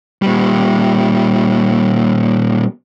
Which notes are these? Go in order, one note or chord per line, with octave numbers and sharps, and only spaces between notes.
A#2 G3